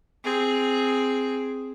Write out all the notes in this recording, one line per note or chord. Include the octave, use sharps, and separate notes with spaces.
C4 G#4